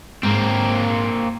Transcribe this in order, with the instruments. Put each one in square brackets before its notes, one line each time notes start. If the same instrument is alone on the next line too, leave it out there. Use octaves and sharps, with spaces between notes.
[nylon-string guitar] G#2 [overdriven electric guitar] A#3 C4